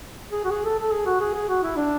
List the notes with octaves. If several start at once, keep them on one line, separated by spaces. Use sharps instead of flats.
G#4
F#4
G#4
A4
A4
G#4
F#4
G#4
G#4
F#4
E4
D4